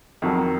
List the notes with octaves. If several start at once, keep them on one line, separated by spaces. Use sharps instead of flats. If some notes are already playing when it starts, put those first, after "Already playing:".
F2 D#3 F#3